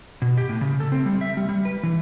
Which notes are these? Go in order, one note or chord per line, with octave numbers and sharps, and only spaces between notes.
B2
G4
A2
C#3
A4
C4
G3
E5
G3
G3
B4
E3